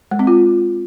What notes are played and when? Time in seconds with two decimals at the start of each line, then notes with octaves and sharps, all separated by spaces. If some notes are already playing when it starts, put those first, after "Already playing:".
0.11 G#3
0.19 C4
0.27 F4